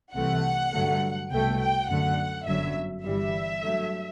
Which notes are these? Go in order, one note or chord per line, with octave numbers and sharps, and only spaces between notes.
C2 C3 E3 A3 F#5
G2 D3 F#3 A3
C2 B2 A3 G5
G5
F#2 D3 A3 F#5
G1 F#2 D3 F#3 E5
G1 G2 E3 G3 E5
G2 F#3 A3